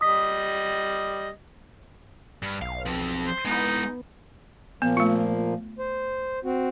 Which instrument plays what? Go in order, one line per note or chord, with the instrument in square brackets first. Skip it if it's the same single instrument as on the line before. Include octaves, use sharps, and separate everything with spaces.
[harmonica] G3 D#5 [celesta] D#6 B6
[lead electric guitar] G2
[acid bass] B1 [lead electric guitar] F5
[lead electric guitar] F3 C4
[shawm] C5
[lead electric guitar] G#3 E4 [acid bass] B3 [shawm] D#4
[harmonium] A#2 F3 A#3 [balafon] B3
[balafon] A3 F4
[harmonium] C5
C4 F#4